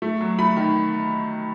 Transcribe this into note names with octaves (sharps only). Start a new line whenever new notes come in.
A3
F#3
A3 B5
D#3